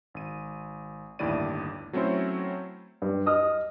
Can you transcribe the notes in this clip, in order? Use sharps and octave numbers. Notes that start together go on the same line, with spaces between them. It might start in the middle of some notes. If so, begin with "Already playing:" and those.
G#1 D#7
G1 D#2 A2 E4 D5 D#7
F#3 A3 C4 C#4 E4 C5
G2
D#5 D#6 F6